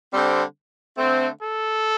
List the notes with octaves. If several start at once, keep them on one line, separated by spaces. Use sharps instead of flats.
D3 G3 C4
D3 A3 C4
A4